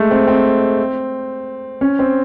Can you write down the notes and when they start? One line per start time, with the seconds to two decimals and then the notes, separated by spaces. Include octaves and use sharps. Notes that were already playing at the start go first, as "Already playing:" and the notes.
Already playing: G#3 A3
0.11 C4
0.27 C4
1.81 C#4
1.99 C4